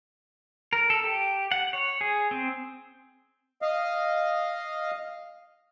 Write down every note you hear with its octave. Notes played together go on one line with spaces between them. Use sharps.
A#4
A4
G4
F#5
C#5
G#4
C4
D#5 F5